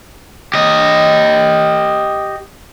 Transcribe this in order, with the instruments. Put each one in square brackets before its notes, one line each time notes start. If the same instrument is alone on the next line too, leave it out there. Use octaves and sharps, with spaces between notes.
[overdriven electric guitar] G4 D#5